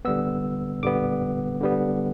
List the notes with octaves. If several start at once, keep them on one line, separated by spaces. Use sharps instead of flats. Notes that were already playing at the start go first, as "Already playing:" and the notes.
D3 G3 B3 E6
D3 G3 B3 D6
D3 G3 B3